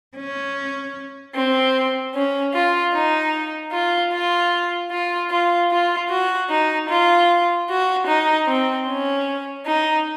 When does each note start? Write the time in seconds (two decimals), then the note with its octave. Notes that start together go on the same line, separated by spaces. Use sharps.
0.16 C#4
1.34 C4
2.14 C#4
2.54 F4
2.93 D#4
3.72 F4
4.12 F4
4.91 F4
5.31 F4
5.71 F4
6.10 F#4
6.50 D#4
6.89 F4
7.69 F#4
8.08 D#4
8.48 C4
8.88 C#4
9.67 D#4